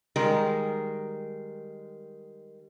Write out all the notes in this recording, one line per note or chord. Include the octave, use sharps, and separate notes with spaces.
D#3 G3 G#3 A#4